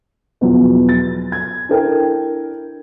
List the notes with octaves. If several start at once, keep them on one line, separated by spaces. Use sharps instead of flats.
E2 B2 F3 F#3
A6
G#6
D4 E4 A4 A#4 G5